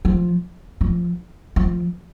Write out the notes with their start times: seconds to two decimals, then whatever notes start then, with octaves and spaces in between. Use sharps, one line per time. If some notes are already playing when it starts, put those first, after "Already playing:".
0.05 F3
0.81 F3
1.56 F3